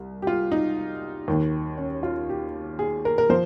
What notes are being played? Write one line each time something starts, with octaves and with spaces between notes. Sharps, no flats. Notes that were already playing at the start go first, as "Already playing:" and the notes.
Already playing: C2
G4
F4
D#4
D#2 D#3
C#4
F4
G4
G#4
A#4
A#4
F3 C5